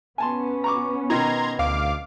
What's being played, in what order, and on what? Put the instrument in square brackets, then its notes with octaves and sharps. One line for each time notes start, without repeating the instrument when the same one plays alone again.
[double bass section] B3 C#4 [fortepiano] G#5 A5 C6
[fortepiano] A#5 C#6 D6
[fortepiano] B2 D#3 D#4 [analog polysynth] A#5 C6 G#6
[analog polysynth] D2 F5 D6